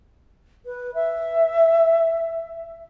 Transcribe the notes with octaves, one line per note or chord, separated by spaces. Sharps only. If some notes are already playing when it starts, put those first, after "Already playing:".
B4
E5